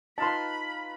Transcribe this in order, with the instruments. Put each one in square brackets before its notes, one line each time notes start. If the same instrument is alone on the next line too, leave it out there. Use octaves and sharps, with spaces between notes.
[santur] D#4 F4 B4 [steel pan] A5 C6 [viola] B5